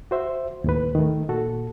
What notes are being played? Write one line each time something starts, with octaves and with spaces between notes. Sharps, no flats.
F#4 C5 E5
D#2 A2 B4
D#3 A3
A#2 F#4 A4